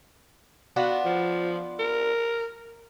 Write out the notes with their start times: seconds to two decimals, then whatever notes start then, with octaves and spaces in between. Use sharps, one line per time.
0.76 B3 D4 F4 F#4
1.05 F3
1.79 A#4